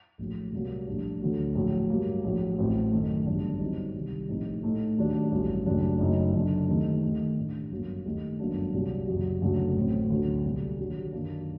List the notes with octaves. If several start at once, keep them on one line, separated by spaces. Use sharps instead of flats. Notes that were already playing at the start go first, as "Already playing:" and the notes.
A#1 A2 F#3
C2 A#2 F#3 A#3
A#1 A2 G3 D4
D2 D3 F#3 A3
A#1 A2 F#3 A3
G2 F#3 A#3
A#1 A2 F#3
A1 A2 F#3 C4
F#2 D#3 A3
G1 F#2 D3 G3 D4
G1 G2 F#3 C4 D#4
C2 C3 D#3 G3
A#1 A2 A3 C4 D#4
A2 A3 D#4
D#2 D#3 F#3 A3 D4
A1 G2 F#3
F#1 F#2 F#3 A3 D4
F#1 F#2 F#3 A3 D#4
F#1 F#2 D3 A3 D4
D#2 D#3 A3 C4 D#4
D#2 D#3 A3
A2 A3 D4
G1 F#2 F#3 A#3
D#2 D#3 A3
G1 F#2 F#3 A#3 D4
C2 A#2 F#3
F#1 F#2 F#3
F#1 F#2 D3 F#3 A3
A1 A2 F#3 C4
D2 D3 F#3
C2 A#2 G3
D#2 D3 F#3
F#2 D#3 F#3 A#3 D4